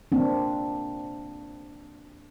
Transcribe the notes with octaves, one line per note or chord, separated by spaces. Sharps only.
A#3 C4 D4